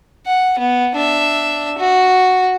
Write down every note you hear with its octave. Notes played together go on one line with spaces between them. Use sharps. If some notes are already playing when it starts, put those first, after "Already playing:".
F#5
B3
D4 E5
F#4